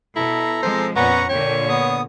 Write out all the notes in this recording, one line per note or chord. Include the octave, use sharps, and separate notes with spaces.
B2 E4 A4 A#5
F3 G#3 C4 C5
F2 A#2 B3 C#4 F#5 A#5 C#6
A#2 D3 A#3 C#5 G5
B3 D#6